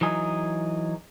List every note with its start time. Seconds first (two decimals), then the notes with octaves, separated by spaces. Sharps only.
0.01 E3 F#3 D#4 G#4